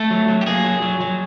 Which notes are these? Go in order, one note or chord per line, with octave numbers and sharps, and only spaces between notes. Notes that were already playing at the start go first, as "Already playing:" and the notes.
Already playing: A3 A4
F#3
F#3
G4
A#3 G#4
F#3
F#3
F#3